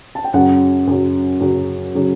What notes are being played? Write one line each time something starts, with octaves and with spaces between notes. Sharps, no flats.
A5
G5
F#2 C#3 F#3 F#5
F#2 C#3 F#3
F#2 C#3 F#3
C#3 F#3